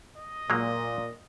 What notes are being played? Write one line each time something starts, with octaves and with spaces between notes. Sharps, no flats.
D#5
A#2 F#3 G#3 A#3